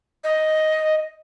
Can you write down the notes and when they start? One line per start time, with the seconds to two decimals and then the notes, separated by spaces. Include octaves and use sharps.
0.24 D#5